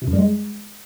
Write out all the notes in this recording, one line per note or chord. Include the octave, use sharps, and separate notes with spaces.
C3
F#2
G3
G#3